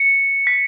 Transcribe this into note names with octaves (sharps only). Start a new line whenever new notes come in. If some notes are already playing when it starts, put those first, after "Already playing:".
Already playing: C#7
B6